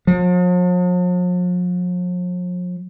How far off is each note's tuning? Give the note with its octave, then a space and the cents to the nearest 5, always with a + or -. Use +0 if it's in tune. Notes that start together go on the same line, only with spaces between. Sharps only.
F3 +45